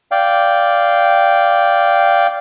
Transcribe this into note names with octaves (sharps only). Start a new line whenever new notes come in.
D5 F5 G5